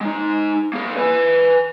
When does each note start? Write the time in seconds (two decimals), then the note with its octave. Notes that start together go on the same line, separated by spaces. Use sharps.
0.01 G#3 D#4
0.73 A#3 G#4
0.97 B4 G#5